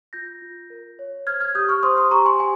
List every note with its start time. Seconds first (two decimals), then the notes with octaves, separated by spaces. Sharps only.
0.13 F4 G6 A#6
0.42 F4
0.70 A#4
0.99 C#5
1.26 C5 F6 G#6
1.40 F6 G#6
1.55 G4 D#6 G6
1.69 C#6 F6
1.83 C5 C6 D#6
1.97 C6 D#6
2.11 G4 A#5 C#6
2.26 G#5 C6
2.40 G4 G#5